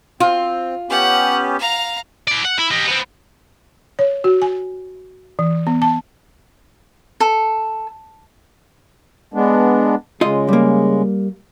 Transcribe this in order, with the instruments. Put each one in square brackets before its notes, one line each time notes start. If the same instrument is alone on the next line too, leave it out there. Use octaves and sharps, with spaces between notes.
[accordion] C4 [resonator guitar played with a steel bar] F4
[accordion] B3 C#4 G4 [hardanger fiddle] F#5
[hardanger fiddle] F5 A#5
[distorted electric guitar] E4 D5
F#5
E4
G4 D#5
B3 C4
[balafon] C#5
F#4
G#5
E3
B3
A5
[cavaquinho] A4
[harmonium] G#3 B3 D4
[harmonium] C#3 G#3 [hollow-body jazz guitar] F4 D#5
[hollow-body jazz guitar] G3 A#3